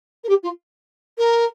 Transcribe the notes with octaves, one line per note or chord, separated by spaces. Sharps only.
A#4
G4
F4
A#4